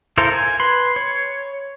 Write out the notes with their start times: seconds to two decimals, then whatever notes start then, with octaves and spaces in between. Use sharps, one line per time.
0.18 E4 A4 A#4 C5 F5
0.32 G#5
0.60 B4 B5 C6
0.96 C#5